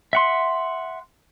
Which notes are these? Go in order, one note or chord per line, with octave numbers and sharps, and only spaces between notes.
E5 F#5 C6